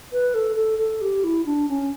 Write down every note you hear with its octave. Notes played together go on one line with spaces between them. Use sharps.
B4
A4
A4
A4
G4
E4
D4
C#4